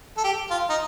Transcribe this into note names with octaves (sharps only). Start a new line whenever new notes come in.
A4
G4
F4
D#4